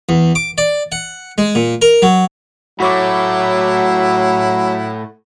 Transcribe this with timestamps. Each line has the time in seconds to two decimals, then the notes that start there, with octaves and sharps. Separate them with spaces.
0.09 E2
0.35 D6
0.58 D5
0.92 F#5
1.38 G#3
1.55 A#2
1.82 A#4
2.02 F#3
2.80 A2 F#3 A3 E4 F#4 C#5 F#5 D6